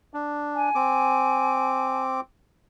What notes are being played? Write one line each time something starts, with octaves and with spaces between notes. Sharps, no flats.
D4
G#5
C4 D6